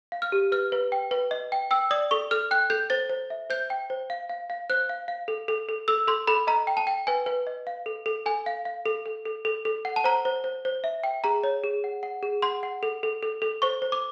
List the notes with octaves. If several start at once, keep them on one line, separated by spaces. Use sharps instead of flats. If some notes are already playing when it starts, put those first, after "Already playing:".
F5
F6
G4
B4 F6
B4
G5
B4
D#5
G5
G5 E6
D5 D#6
A4 C#6
A4 F6
G5 F#6
A4 G6
C5 A6
C5
E5
C5 G6
G5
C5
F5
F5
F5
C5 F#6
F5
F5
A4
A4
A4
A4 E6
A4 C6
A4 B5
D#5 A#5
G5
A5
G5
B4 G#5
B4
D#5
F5
A4
A4
A4 G#5
F5
F5
A4
A4
A4
A4
A4
F#5
A5
C5 A#5
C5
C5
C5
E5
G5
G#4 A#5
C#5
G#4
F#5
F#5
G#4
F#5 C6
F#5
A4
A4
A4
A4
C5 C#6
C5
D6